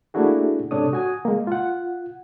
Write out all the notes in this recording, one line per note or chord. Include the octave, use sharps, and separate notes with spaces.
A3 A#3 D4 E4 F#4 G#4
G#2 C3 D4 A4 C#5 D#6
F#4 G#5 D#6
G#3 A#3
F4 F#5